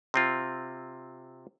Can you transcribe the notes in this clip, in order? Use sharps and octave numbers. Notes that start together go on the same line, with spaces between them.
C3 C4 F4